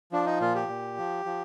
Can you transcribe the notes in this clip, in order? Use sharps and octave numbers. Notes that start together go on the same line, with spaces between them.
F3 D4
D#4
A#2 F4
G4
A#2
F3
F3